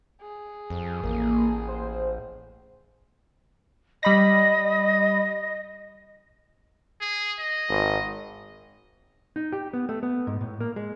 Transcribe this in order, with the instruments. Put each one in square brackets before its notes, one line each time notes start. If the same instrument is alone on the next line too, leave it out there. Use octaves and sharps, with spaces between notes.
[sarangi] G#4
[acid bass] F2
[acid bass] A1 [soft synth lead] A#3
[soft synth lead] C5
[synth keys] G3 B5 A#6 [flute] D#5
[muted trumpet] G#4
D#5
[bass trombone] G#1
[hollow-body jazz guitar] D#4
G4
B3
A3
B3
G#2
A2
A#3
G#3